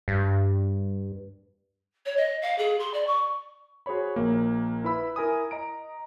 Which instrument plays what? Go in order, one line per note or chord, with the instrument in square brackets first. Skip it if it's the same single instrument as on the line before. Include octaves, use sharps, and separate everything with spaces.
[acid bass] G2
[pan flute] C#5
D#5
F5
G#4
C6
D5
C#6
[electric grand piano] F#4 G#4 C5 C#5 B5
A#1 A#3
E4 B4 B5 E6
E4 A#4 G#5 D#6
D#5 A#5 D7